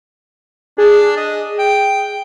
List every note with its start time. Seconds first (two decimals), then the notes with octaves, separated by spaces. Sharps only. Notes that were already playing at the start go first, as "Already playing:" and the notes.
0.78 D4 G#4
1.17 D#5
1.59 G5